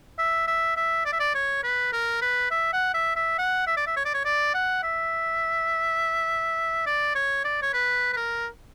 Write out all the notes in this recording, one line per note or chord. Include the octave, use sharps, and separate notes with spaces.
E5
E5
E5
D5
E5
D5
C#5
B4
A#4
B4
E5
F#5
E5
E5
F#5
E5
D5
E5
C#5
D5
C#5
D5
F#5
E5
D5
C#5
D5
C#5
B4
B4
A#4